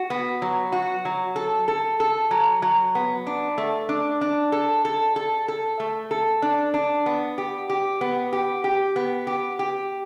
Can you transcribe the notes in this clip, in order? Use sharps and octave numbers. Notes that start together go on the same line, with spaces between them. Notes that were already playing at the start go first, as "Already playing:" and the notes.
Already playing: F#4
B3
F#3
F#4
F#3
A4
A4
A4
F#3
F#3
B3
D4
A3
D4
D4
A4
A4
A4
A4
A3
A4
D4
D4
B3
G4
G4
B3
G4
G4
B3
G4
G4